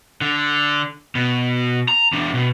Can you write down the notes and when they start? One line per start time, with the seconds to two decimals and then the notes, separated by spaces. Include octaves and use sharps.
0.21 D3
1.15 B2
1.88 A#5
2.13 E2 D4
2.34 B2